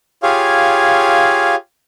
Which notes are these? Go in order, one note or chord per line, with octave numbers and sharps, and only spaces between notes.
F4 G4 G#4 C#5 F5